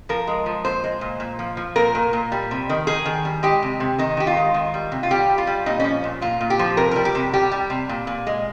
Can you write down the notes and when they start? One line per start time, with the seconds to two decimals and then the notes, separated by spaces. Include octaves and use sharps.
0.09 F3 A#4
0.27 G#3
0.46 F3
0.64 A#2 C5
0.84 G#3
1.01 A#2
1.20 A#2
1.39 F3
1.57 F3
1.76 A#2 A#4
1.95 A#2
2.13 A#2
2.32 G3
2.51 C3
2.69 D#3
2.87 D#3 G#4
3.06 D#3
3.25 G3
3.43 G#3 G4
3.62 C3
3.80 C3
3.98 D#3 D#4
4.17 D#3 G4
4.27 F4
4.37 G#3
4.54 D#3
4.74 G3
4.92 C3
5.03 F4
5.11 G3 G4
5.29 G3
5.38 F4
5.47 G3
5.66 A#2 D#4
5.80 F3 C#4
6.04 A#2
6.22 A#2 F4
6.41 A#2
6.50 G4
6.59 F3
6.77 C3 A#4
6.91 G3 A#4
7.05 G4
7.15 C3
7.33 G3 G4
7.51 G3
7.70 C3
7.89 A#2
8.07 A#2
8.27 G#3